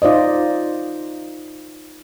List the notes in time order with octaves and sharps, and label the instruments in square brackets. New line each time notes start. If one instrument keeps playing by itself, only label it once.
[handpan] D#4 F4 C5 D5 D#5